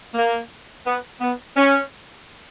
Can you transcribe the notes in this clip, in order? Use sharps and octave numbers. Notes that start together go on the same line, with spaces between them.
A#3
B3
B3
C#4